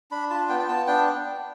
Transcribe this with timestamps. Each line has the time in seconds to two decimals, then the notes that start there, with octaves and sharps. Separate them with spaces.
0.11 D4 B5
0.30 F4 A5
0.49 B3 G5
0.60 G5
0.68 B3 A5
0.87 D4 G5